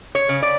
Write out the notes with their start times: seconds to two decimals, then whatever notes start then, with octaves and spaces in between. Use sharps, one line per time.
0.15 C#5
0.29 C#3
0.42 D5